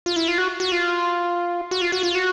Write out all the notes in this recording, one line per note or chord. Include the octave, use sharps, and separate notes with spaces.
F4
E4
F4
F#4
F#4
F4
F#4
F4
F#4
F4
F#4